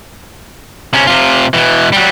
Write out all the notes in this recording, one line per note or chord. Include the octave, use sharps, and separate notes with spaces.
C3 C#4
C3 F4
B2 E3
F#3 G3